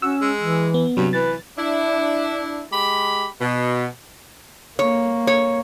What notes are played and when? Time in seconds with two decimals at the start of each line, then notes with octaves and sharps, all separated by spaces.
0.02 C#4 F#4 E6
0.21 G#3
0.41 E3
0.74 B3
0.97 G2 C3 F#3
1.13 E3 B4 A6
1.58 D4 E4
2.71 G#3 G4 B5
3.40 B2
4.79 A#3 C#5
5.27 C#5